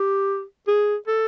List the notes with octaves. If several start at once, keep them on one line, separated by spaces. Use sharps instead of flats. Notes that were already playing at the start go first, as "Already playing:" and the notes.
Already playing: G4
G#4
A4